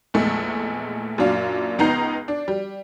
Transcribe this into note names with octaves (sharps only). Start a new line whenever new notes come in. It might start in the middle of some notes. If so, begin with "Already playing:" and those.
A#1 E2 G#3 A3
F#2 A#2 D4 F5
C#2 B3 D#4 A#5 G6 C7
D4
G3